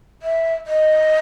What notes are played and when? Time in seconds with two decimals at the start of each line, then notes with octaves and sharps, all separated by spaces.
0.22 E5
0.67 D#5